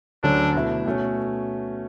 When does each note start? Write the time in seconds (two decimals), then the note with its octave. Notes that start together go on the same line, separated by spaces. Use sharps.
0.23 D2 D3 F#3 C#4 D4
0.55 B2 A3 E4
0.86 B2 A3 C#4